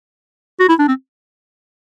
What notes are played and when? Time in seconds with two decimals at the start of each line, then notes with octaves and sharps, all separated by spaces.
0.60 F#4
0.69 E4
0.79 D4
0.88 C4